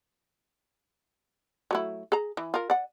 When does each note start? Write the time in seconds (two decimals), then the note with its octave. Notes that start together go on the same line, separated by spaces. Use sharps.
1.71 F#3 A3 E4
2.12 G#4 A#5
2.37 E3
2.54 F4 A#4
2.70 D5 F#5